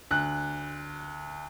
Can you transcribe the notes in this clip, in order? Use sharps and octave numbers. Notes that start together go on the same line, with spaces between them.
D2 F#6